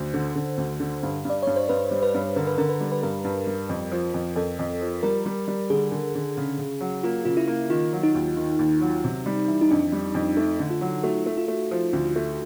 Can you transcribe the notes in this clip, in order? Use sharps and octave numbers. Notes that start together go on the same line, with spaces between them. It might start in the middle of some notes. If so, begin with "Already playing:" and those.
Already playing: D2 C5
D3
D3
D2
D3
G2
G2 D5
G2 C#5
C5
G2 B4
G3
B4
G2
D3 A#4
B4
D3 A#4
B4
G3
B4
G2 A#4
G2
G3
F2
F3
F2
F2 A4
F2
F3
G3 A#4
G3
G3
D3 G#4
D3
D3
C#3
C#3
F#3
A#3 F4
C#3 F4
E4
A#3
D#3 F4
F#3
D#4
D#2
D#3
D#2
F#3
C3
G3
E3
D#4
F2 D4
G3
F2
A3 D#4
D3
F4
F#3
A3 F#4
A3
F4
A3
F3
D2
A3